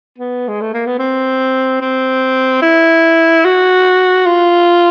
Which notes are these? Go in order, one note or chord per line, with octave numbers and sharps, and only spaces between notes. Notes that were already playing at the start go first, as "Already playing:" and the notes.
B3
G#3
A3
A#3
B3
C4
C4
E4
F#4
F4